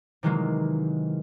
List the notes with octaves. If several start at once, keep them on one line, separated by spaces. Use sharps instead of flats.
C3 D#3 E3 F#3 G#3 A#3